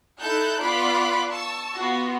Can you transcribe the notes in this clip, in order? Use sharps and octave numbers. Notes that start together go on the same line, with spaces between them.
D#4 E4 A4 A5 F#6 G6
B3 F4 D5 B5 D6 F#6
A5 C#6 E6
B3 F4 F#4